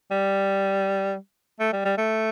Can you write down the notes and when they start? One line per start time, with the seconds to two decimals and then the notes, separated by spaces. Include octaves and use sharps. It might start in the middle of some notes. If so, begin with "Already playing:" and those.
0.11 G3
1.60 A3
1.73 G3
1.85 G3
1.98 A3